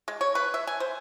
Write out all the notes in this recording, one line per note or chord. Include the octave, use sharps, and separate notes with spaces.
G#3
C#5
B4
E5
G#5
C5